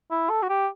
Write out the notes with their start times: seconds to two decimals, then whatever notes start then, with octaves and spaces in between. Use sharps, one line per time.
0.11 E4
0.30 A4
0.42 F#4
0.49 G4